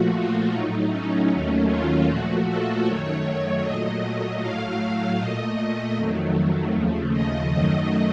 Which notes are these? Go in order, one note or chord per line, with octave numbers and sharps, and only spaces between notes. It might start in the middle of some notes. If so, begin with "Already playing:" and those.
Already playing: A#2 F3 A3 F#4
F4
A2 F#3 A3 D#4
C#4
D#2 D#3 F#3 A3 C#4
F4
A#2 F3 A3 F#4
A4
F#2 D#3 F#3 A3 C#5
A#2 F#3 A3 D#5
A2 F#3 A3 F5
A#2 A3 D#5
D#5
F2 D#3 F#3 A3
D#2 C#3 F3 A3
D#5
F#2 D#3 F#3 A3 D#5